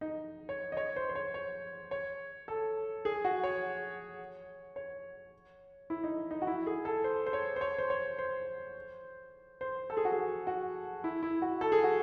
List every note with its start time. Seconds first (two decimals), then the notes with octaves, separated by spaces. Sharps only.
0.01 D#4
0.49 C#5
0.72 D#5
0.77 C#5
0.96 C5
1.09 C5
1.15 C#5
1.34 C#5
1.91 C#5
2.48 A4
3.05 G#4
3.25 F#4
3.43 C#5
4.76 C#5
5.90 E4
6.04 D#4
6.31 D#4
6.42 F#4
6.47 E4
6.66 G#4
6.85 A4
7.04 C5
7.26 C5
7.33 C#5
7.56 C5
7.61 C#5
7.78 C5
7.90 C#5
8.19 C5
9.61 C5
9.90 A4
9.97 G#4
10.05 F#4
10.12 G#4
10.47 F#4
11.04 E4
11.23 E4
11.42 F#4
11.61 A4
11.72 G#4
11.84 F#4